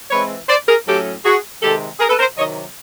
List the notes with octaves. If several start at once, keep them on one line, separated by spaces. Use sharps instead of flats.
E3 G#3 C4 B4 C#5
C5 D5
G#4 A#4
A2 F#3 A3 C#4 G4 A4
F#4 G#4
C3 D#3 G#3 G4 A4
G#4 A#4
A4 B4
A#4 C5
C3 D#3 F#3 C#5 D#5